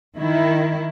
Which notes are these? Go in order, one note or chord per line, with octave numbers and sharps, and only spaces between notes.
D#3 E4